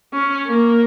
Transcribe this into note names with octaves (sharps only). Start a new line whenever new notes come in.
C#4
A#3